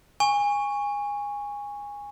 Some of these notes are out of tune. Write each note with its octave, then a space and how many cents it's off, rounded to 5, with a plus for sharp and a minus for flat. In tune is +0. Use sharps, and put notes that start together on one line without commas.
G#5 -20 C#6 +0